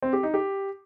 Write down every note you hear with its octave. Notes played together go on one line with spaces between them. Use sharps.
C4
G4
D#4
G4